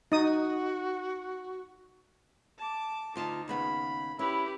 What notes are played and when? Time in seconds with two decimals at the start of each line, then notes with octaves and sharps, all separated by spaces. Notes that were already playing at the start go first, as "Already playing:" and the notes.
0.12 D#4 F#4 D#6
2.58 A5 D6
3.15 D2 D#4 F4 A5
3.48 D#2 C#3 B3 B5
4.19 C#4 E4 G4 B4